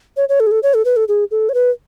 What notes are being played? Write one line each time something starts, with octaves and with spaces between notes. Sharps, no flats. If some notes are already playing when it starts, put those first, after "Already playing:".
C#5
C#5
A4
G#4
A4
C#5
A4
B4
A4
G#4
A4
C#5
B4